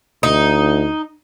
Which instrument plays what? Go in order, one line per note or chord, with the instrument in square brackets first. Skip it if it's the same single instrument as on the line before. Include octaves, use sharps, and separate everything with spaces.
[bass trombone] D2 [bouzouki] D#4